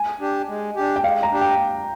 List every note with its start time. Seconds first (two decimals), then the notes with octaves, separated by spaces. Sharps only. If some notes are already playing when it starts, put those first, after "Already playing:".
Already playing: G#5
0.20 D4 G4
0.48 G#3
0.76 D4 G4
0.96 G5
1.04 G#3 F5
1.23 A#5
1.31 D4 G4
1.41 G5